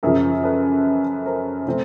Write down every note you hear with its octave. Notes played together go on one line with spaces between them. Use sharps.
F#2 C#3 F3 G#4 A#4
A4 B4
A#4 C5
C#3 F3 A3 C4